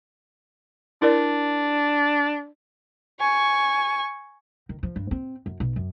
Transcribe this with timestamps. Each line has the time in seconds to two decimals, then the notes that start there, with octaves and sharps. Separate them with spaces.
1.02 D4 E4 A#4 D5
3.20 G#5 C#6
4.69 D#3
4.83 F3
4.96 G2
5.11 C4
5.46 F#2
5.60 B1
5.76 F#2